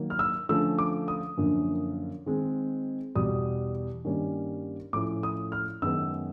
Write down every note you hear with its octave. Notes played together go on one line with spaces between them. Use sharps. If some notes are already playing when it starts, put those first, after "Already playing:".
Already playing: D#3 F#3 A#3
F6
E6
D3 F3 A3 C#4 E6
D6
D#6
F#2 D3 F3 A#3
D#3 G#3 C4
E2 B2 G3 D#6
G2 D#3 G3 A#3 C#4
A2 F3 A3 C#4 E4 D6
D#6
F6
F#2 D#3 G#3 B3 E6